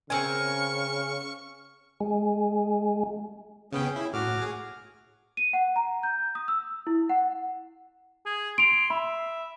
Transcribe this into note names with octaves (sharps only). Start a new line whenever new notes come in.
C#3 C4 A#4 G#5 C#6 F6
G#3
C#3 B3 C#4 G#4 G5
E4
A2 F#4 D6 F6
G#4
D#7
F#5
A#5
G6
D#6
E6
E4
F#5
G#4
C6 D7 F7
E5 B5